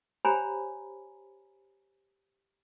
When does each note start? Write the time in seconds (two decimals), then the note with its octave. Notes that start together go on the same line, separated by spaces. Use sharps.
0.25 G4 C5 C#5 G#5 A#5 B5